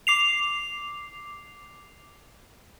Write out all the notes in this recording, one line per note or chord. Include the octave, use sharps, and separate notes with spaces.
D6 C7 F7